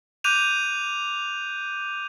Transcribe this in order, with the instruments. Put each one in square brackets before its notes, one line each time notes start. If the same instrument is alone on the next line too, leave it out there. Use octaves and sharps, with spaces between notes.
[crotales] D6 F#6 G6 D#7 F7